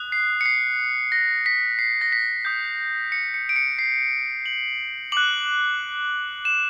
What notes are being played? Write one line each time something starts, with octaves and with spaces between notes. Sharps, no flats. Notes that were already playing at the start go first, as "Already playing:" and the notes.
Already playing: D#6 F#6
C7
C#7
C7
A#6
B6
C7
A#6
B6
D#6 G6
C#7
C#7
D7
C#7
C7
F#7
D6 F#6 F#7
E7